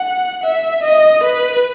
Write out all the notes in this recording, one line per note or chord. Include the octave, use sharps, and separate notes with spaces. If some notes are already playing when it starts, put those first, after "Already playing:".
Already playing: F#5
E5
D#5
B4